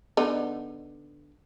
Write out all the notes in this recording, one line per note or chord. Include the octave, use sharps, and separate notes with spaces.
D3 B3 D#4